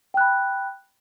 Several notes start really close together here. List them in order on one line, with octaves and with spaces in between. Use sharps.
G5 F#6 B5